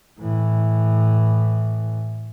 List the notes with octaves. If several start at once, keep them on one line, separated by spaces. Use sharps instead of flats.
A2 E3